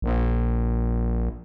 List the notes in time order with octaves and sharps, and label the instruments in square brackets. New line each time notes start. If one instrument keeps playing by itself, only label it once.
[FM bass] A#1